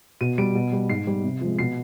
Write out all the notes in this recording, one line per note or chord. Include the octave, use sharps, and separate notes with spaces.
B2 D#7
G3 D7
B2
G3
G#2 C7
G3
C3
F3 G#3
B2 C7